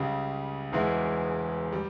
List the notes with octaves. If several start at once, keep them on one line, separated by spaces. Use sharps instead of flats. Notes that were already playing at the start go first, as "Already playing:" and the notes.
Already playing: C#2 C#3 G3
E1 E2 E3 G#3 E4
G3